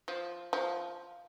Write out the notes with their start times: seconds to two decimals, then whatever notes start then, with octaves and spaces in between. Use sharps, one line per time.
0.08 F3
0.53 F3